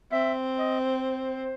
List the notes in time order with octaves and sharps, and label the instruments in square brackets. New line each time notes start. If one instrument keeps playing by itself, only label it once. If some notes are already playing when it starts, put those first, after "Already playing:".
[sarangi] C4 [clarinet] E5
[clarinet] D#5
C5